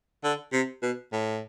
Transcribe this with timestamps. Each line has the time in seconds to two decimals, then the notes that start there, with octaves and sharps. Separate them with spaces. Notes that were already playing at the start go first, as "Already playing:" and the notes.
0.24 D3
0.53 C3
0.82 B2
1.13 A2